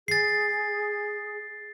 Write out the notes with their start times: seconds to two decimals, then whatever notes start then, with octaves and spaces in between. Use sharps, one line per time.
0.08 G#4 A6 C7